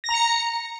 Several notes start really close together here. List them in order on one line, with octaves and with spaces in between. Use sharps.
A#6 A#5 C#7